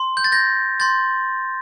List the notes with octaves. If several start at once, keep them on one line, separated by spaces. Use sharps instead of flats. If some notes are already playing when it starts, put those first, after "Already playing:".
Already playing: C6
G6
A6
G6 A#6
C6 G6 A6